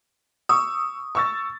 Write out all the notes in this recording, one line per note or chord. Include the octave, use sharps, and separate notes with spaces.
C#6 D#6 E6
C#6 E6 A6